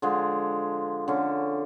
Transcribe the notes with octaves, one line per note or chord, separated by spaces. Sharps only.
D3 F3 G#3
D3 C#4